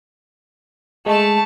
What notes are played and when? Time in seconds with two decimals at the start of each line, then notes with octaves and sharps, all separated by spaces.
1.06 G#3 A3 A5